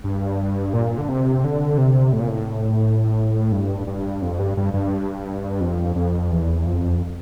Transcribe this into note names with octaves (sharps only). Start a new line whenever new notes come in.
G2
A#2
D3
C3
D3
C3
A2
A#2
A2
G2
G2
F2
G2
G2
G2
F2
F2
E2
F2